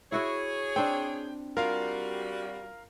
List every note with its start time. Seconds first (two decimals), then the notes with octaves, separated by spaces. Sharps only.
0.12 E4 F#4 G#4 C#5 E5
0.76 C4 D4 G5
1.57 G3 F4 F#4 A#4 F5